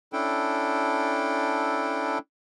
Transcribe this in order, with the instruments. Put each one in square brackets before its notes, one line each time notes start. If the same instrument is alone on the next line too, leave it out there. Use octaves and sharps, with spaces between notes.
[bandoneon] C#4 D4 E4 A4 G5